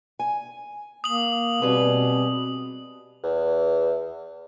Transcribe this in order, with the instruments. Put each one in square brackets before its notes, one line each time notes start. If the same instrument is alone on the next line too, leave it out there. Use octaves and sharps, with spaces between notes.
[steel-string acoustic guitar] G#5
[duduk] A#3 [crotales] D#6 F#7
[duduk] B2 [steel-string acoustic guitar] G3 G#4 B4 [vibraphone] C4
[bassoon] E2